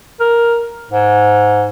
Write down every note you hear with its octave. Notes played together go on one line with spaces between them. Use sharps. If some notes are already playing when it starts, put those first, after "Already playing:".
A#4
G#2